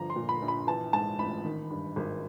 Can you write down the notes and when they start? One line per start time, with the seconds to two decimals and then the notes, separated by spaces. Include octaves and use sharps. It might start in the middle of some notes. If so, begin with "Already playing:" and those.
Already playing: G1 F3 A#5
0.10 C6
0.16 A#2
0.29 B5
0.42 A#1
0.48 B5
0.67 E3 A5
0.93 G#2 A5
1.19 A1 B5
1.45 D#3
1.70 G2
1.96 G#1